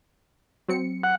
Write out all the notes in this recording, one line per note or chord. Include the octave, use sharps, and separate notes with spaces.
F#3 C4 C#7
F#5